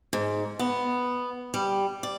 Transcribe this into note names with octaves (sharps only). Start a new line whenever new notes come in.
G#2
B3
G3
D5